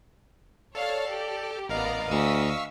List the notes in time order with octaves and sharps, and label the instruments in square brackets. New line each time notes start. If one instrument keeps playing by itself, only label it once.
[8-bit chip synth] A4 [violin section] C#5 F5 A5 [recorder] D5
[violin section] G4
[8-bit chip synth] A1 A#4 F5 [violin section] B3 D5 A#5 [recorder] D#5
[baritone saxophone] D2 [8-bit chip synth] F5 C#6 E6 [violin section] D#6 B6